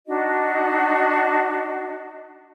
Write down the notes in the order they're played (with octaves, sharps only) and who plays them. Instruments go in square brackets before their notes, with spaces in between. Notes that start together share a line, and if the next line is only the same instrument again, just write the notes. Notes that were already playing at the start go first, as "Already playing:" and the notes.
[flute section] D4 D#4 F#4 D#5